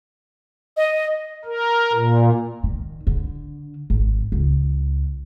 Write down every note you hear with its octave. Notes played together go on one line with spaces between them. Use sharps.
D#5
A#4
A#2
D#3
D3
G#1
C#2